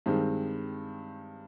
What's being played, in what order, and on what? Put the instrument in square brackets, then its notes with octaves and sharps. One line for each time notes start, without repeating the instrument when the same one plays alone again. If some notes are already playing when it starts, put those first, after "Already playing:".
[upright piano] G2 D#3 G#3 C4 D#4